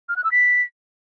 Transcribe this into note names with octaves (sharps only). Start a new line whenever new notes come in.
F6
F#6
E6
B6